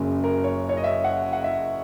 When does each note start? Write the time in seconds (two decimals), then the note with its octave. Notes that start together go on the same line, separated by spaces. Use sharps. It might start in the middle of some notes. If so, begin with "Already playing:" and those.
Already playing: F#1 F#2 C#3
0.24 A#4
0.44 C#5
0.69 C#5
0.77 D#5
0.84 E5
1.04 F#5
1.33 F#5
1.44 E5